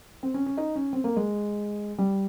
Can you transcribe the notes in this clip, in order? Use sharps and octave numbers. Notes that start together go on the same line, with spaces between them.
C4
C#4
C#4
D#4
C#4
C4
A#3
G#3
G3